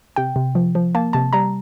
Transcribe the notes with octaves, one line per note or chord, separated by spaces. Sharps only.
C3 G5
C3
F3
F3
A#3 A5
C3 A5
G3 A#5